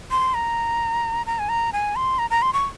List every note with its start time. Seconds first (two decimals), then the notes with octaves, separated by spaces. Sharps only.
0.11 C6
0.34 A#5
1.27 A#5
1.39 G#5
1.49 A#5
1.73 G#5
1.96 C6
2.19 A#5
2.30 A#5
2.42 C6
2.53 C#6